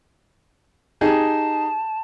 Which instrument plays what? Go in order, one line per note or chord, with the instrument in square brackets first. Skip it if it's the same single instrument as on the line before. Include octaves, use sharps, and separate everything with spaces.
[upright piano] D#4 G4 G#4 [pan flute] A5